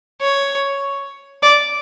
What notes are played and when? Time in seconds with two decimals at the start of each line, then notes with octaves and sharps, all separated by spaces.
0.21 C#5
1.42 D5